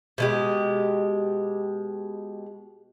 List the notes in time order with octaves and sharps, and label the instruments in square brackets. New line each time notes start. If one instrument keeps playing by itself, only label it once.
[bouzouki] B2 G#3 G4